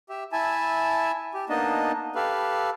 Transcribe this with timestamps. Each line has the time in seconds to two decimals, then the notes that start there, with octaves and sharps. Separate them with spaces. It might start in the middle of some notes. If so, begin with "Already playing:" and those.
0.10 G4 E5
0.33 E4 E5 G#5 A5
1.34 G4
1.49 A#3 B3 D4 D#4 D#5 A5
2.15 G4 A4 B4 F5